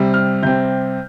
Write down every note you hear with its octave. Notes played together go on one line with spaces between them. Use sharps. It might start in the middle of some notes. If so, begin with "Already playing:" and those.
Already playing: C3 G3 C4
F6
C3 G3 C4 G6